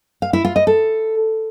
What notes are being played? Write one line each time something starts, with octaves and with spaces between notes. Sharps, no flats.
F5
E4
F4
D#5
A4